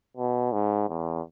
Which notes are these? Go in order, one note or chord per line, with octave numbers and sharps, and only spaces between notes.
B2
G#2
E2